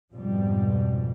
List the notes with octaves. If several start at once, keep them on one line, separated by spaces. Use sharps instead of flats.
F2 G#2 B2 F3 G3